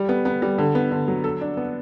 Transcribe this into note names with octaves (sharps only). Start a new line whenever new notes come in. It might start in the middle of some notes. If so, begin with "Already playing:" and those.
Already playing: G3
B3
B3
G3
D3
B3
D3
F#3
A4
D4
B3